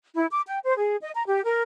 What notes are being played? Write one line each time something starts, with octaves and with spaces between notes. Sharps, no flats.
E4
D6
G5
C5
G#4
D#5
A#5
G4
A#4